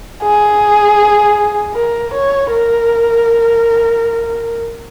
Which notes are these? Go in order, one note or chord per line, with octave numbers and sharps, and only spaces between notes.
G#4
A#4
C#5
A#4